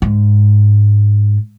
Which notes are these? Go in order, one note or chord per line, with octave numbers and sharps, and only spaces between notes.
G#2